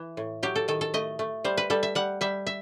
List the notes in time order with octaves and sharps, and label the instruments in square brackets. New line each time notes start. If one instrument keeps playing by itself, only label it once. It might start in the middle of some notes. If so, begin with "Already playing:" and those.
Already playing: [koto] E3
A2
F#3 G4
A4
D#3 A4
A4
A3 D#5
A3
G3 C5
B4
G3 A4
E5
G3 F#5
G3 E5
E5